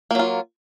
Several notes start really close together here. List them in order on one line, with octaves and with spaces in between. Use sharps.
A#3 F#3 F4